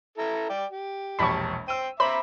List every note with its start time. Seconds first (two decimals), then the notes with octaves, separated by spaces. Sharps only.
0.18 E4 A4 A#5
0.49 D5 G5
0.71 G4
1.19 E1 A#1 A5 B5 C#6
1.68 C5 G5 E6 D#7
2.00 C5 E5 A#5 B5 D6